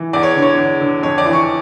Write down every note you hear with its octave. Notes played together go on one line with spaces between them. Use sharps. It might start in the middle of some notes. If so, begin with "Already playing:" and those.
Already playing: E3
E2 D5
C#5
D3
C#5
E2
D3
F2 C#5
D5
E3
C#6